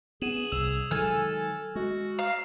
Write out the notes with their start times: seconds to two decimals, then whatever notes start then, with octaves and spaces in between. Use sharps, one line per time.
0.22 B3 G#4 D#7 E7 F#7
0.52 C2 E6 E7 F7
0.91 D#3 F#3 G#3 A4 G#5 F6
1.75 G#3 F#4
2.19 F5 A#5